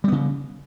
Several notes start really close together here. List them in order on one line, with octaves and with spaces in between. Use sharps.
G3 B3 C#3